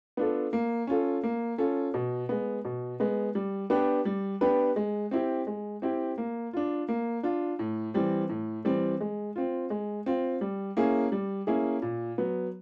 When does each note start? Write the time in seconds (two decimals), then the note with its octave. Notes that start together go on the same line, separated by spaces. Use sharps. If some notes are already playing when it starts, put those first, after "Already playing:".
0.17 B3 D4 F4 A4
0.53 A#3
0.87 C#4 F4 A4
1.23 A#3
1.58 C#4 F4 A4
1.94 B2
2.29 G#3 B3
2.65 B2
3.00 G#3 B3
3.35 G3
3.70 B3 D4 G4 B4
4.05 G3
4.41 B3 D4 G4 B4
4.76 G#3
5.11 C4 E4 G4
5.47 G#3
5.82 C4 E4 G4
6.18 A#3
6.53 D4 F4
6.89 A#3
7.23 D4 F4
7.59 A2
7.94 E3 G3 C4
8.29 A2
8.65 E3 G3 C4
9.00 G#3
9.36 C4 F4
9.70 G#3
10.06 C4 F4
10.41 G3
10.77 A#3 C#4 E4 G#4
11.12 G3
11.47 A#3 C#4 E4 G#4
11.82 A#2
12.18 F#3 B3